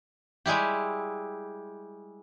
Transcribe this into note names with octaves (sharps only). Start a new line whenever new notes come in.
G3 G#3 E4 G4